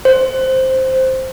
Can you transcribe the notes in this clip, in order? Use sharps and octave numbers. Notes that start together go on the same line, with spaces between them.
C5